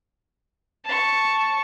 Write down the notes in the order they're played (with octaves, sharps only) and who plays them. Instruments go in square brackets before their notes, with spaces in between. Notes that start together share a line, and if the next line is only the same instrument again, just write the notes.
[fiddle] A5 C#6